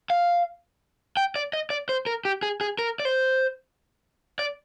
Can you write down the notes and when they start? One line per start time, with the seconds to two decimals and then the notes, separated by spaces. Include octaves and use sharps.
0.10 F5
1.17 G5
1.36 D5
1.53 D#5
1.70 D5
1.89 C5
2.06 A#4
2.25 G4
2.42 G#4
2.61 G#4
2.79 A#4
3.00 D5
3.05 C5
4.39 D5